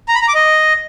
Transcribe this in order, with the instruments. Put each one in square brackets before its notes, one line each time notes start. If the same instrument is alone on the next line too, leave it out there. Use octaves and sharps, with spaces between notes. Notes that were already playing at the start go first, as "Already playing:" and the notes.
[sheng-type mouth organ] A#5
B5
A#5
D6
D#5